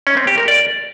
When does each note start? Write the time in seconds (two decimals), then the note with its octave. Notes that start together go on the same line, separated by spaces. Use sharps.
0.07 C#4
0.17 C4
0.27 G4
0.38 A#4
0.48 D5